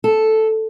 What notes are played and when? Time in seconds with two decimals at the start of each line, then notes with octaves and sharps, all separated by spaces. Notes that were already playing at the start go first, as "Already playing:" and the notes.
0.04 A4